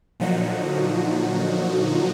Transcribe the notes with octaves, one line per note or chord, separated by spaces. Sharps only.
A#2 D3 F3 F#3 D#4 F#4